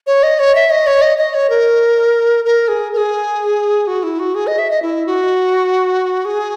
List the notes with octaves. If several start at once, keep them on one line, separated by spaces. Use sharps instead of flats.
C#5
D#5
C#5
E5
D#5
C#5
D#5
D#5
C#5
A#4
A#4
G#4
A#4
G#4
F#4
E4
F#4
G#4
D#5
E5
D#5
E4
F#4
G#4